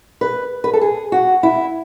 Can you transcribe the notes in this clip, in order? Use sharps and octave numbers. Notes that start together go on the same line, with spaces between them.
B4
B4
A4
G#4
F#4
E4